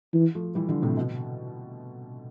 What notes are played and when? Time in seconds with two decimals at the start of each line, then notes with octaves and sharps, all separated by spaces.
0.14 E3
0.35 F3 A3
0.55 E3 G3
0.69 D3 F3
0.82 A2 C3
0.97 B2